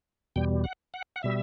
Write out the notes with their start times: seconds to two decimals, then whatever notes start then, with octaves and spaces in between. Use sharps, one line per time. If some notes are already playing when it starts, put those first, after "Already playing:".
0.36 E2 B2 G3 G5
0.64 F#5
0.94 F#5
1.16 F#5
1.23 B2 G3 E5